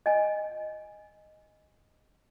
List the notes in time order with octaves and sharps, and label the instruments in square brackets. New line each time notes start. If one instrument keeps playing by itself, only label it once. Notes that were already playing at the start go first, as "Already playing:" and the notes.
[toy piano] D#5 G#5